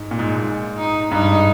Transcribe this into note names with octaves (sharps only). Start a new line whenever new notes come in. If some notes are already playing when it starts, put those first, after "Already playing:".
Already playing: G#2
A#2
G#2
G#2
D#4
G2 D#4
G#2